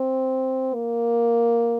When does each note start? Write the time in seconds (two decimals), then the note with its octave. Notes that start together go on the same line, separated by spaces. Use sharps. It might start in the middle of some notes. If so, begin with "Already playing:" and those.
Already playing: C4
0.74 A#3